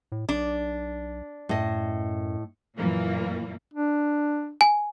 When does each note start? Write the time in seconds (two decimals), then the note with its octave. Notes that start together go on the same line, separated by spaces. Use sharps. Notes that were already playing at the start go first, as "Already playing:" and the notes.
0.12 A2
0.29 B1 D4
1.49 F#2 A2 D#5
2.77 F#2 A#2 E3 A#3
3.74 D4
4.61 G#5